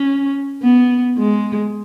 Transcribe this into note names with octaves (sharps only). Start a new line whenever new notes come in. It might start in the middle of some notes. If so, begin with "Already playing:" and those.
Already playing: C#4
B3
G#3